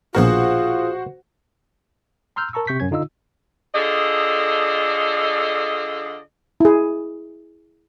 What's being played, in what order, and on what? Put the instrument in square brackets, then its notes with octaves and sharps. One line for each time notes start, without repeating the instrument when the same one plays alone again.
[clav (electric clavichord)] A#1 B2 A#4 [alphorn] F4 [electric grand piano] F#4 C5 F#5 [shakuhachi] G#4
[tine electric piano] A#5 C6 E6 F6 G6
A#4 A5 A#5 C#6 E6
C3 C#6 G6 B6
F#2 C#4 G#6
D3 D#4 F4 D#5 E6
[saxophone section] D3 F4 G#4 A4 D5 D#5
[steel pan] E4 G#4